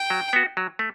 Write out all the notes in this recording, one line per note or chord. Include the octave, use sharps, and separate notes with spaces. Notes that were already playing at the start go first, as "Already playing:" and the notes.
Already playing: G5
F#3
B3 F#4
F#3
A3